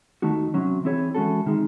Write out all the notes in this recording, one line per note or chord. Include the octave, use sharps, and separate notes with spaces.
D#2 D#3 A3 D#4 F#4
C3 F#3 C#4
E3 C4 E4 G#4 C#5
E3 G#3 C#4 F#4 A4
C3 D#3 G#3